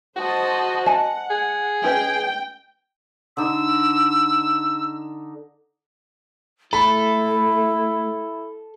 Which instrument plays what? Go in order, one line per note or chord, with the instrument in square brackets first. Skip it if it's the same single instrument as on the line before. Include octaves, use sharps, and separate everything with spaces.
[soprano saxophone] F#4 [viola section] C5 D#5 A5
[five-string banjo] D#5 G#5 A5 [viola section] F#5
[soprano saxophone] G#4
[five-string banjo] C#4 B4 D#5 [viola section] G5
[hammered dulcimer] D3 D4 D#4 [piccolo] E6
[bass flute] A3 [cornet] E4 [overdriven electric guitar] A4 [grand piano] B5